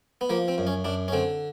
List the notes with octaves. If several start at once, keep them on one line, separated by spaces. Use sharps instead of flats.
B3
F3 A#3
C4
F#2
C#4
F#2 D4
C#4
D3 C4